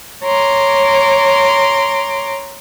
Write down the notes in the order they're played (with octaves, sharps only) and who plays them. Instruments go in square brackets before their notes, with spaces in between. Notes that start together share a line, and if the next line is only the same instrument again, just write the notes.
[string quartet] C#5 A#5 C6 D6